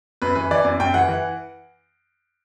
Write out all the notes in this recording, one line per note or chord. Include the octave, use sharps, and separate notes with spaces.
F#2 B4
E3 B4
E3 D5
F#2
F#2 G5
E3 F#5
E3